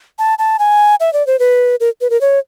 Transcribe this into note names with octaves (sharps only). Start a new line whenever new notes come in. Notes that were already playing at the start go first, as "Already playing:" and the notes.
A5
A5
G#5
E5
D5
C5
B4
A#4
B4
A#4
C#5